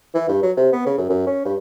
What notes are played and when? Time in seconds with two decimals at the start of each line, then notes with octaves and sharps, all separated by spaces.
0.14 E3
0.28 G2
0.42 F#3
0.57 C3
0.72 B3
0.86 C#3
0.98 F#2
1.09 F#2
1.27 C#4
1.45 G2